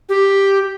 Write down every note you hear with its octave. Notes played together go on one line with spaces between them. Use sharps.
G4